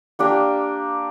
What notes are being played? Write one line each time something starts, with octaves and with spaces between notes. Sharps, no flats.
A#3 D4 G4 A#4